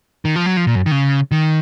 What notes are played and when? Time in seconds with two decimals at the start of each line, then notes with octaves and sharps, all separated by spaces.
0.25 D#3
0.36 F3
0.46 F#3
0.57 F3
0.67 A#2
0.75 F#2
0.86 D#3
0.91 C#3
1.31 D#3